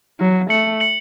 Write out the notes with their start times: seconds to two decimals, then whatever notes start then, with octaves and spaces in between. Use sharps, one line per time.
0.20 F#3
0.50 A3 C#7 F#7
0.80 C#7 F#7